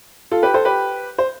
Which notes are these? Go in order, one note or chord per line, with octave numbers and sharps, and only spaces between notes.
F4 A4
G4 B4
A4 C5
G4 B4
C5